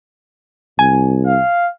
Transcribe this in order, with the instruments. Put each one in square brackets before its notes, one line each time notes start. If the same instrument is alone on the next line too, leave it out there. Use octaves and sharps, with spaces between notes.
[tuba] C2 [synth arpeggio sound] G#5
[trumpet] F5